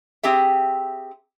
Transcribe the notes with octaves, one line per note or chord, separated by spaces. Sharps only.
C4 G4 G#4 E5